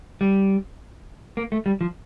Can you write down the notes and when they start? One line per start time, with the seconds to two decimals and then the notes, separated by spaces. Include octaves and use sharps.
0.21 G3
1.37 A#3
1.52 A3
1.66 G3
1.81 F3